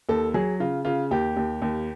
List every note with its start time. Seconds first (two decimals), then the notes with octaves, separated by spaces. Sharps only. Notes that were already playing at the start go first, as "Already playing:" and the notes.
0.09 D#2 A4
0.34 F#3 G#4
0.60 C#3 F4
0.85 C#3 F4
1.11 D#2 G4
1.37 D#2
1.62 D#2